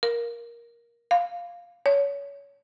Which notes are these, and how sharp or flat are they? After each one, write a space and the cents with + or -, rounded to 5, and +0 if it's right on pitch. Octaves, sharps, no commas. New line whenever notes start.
A#4 +15
F5 +0
C#5 +25